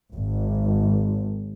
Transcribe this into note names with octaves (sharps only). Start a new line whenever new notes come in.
G#1